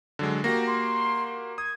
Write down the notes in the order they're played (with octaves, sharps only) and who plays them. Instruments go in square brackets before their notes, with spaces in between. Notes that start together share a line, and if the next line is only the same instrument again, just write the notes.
[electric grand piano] D3 F#3 G#3
[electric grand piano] A#3 F#4 G4 [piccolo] A#6
[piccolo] C6
[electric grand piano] D#6 [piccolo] G#6